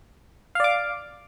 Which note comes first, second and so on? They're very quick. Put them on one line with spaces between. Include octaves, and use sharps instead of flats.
F5 D5 D6